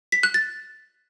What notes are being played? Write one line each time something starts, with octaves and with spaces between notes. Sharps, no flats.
B6
F#6
A6